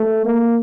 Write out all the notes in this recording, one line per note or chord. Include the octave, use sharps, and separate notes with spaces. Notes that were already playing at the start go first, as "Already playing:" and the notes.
Already playing: A3
A#3